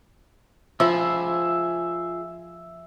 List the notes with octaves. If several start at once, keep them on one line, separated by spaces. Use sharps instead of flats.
F3 F4 G#4 E5 B5